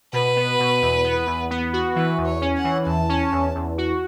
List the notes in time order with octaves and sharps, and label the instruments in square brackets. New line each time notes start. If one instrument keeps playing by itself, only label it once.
[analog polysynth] B2 [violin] B4
[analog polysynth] B3
B2
E2
B3
E2
B3
F#4
[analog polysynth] E3 [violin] B4
[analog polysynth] E2
[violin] C#5
[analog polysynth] C#4
[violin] F#5
[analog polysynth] E3
[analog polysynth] E2 [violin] A5
[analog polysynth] C#4
E2
E2
F#4